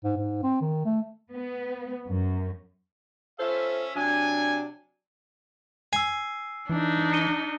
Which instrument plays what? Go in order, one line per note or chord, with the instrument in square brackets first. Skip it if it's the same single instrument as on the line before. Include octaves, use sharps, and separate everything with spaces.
[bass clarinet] G#2
G#2
C4
D#3
A3
[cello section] B3
F#2
[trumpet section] C#4 E5 [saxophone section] F4 A4 C5
[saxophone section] C3 F#3 D4 [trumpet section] G#5
[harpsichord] G#5 [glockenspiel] E6 C7
[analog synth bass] E3 [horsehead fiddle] D4 D#4
[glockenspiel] C#7 D#7 G7